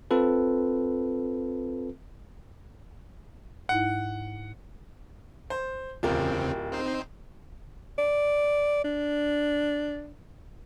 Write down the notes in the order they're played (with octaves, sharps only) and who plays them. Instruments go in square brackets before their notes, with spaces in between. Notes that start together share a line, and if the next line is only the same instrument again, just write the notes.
[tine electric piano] C4 F4 A4 B4
[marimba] G#2 D#4 E4 [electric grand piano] F#5
[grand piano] C5
[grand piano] D1 [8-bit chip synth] E2 C#3 C4 [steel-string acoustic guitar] F4 G4 A#4
[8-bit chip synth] C4 D#4 C5
[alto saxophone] D5
D4